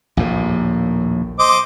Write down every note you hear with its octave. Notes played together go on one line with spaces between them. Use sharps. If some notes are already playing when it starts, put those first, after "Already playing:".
A#1 D#2 A2
C5 D#5 D6